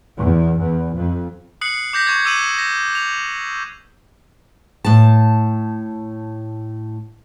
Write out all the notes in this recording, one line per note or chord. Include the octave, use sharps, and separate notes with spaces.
E2
E2
F2
D#6 F#6 C7 C#7 F#7
D6 G6 A#6 B6
C#6 G6 G#6
D6 E6 D#7 E7 F#7
A#6
F7
A2 A5